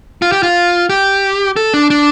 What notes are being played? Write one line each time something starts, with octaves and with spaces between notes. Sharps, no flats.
F4
G4
F4
G4
A4
D4
D4